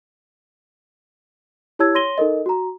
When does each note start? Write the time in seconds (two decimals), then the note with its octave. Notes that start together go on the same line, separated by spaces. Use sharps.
1.79 E4 G4 C#5 A5 E6 G#6
1.95 C#5 C6 A#6 D#7 G7
2.18 D#4 A4 A#4 D#5
2.46 F#4 A#5